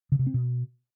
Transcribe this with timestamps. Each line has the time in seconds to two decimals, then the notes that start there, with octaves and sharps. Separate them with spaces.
0.12 C#3
0.19 C3
0.27 C4
0.34 B2